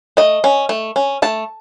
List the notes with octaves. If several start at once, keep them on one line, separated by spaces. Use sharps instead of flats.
A3 D#5
C#4
A3
C#4
A3 A5